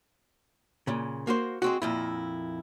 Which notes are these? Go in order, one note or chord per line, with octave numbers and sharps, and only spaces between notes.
A#2 C#3
A#3 F#4 C5
G#3 C4 F#4
F2 A#2 E4